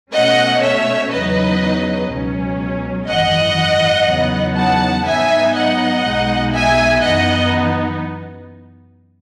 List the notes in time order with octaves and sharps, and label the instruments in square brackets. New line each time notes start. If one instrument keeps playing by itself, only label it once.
[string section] B2 A3 C#4 D#5 F#5
C#5 E5
E2 C#3 F#3 B3 D#4 B4 D#5
C#2 B2 F#3 C#4
G#1 F#2 E3 D#5 F#5
E2 C#3 F#3 B3 D#4
F#5 A5
G#2 F#3 B3 D#4 E5 G#5
D#5 F#5
B1 B2 G#3 D#4
E5 G#5
F#2 E3 B3 D#4 D#5 F#5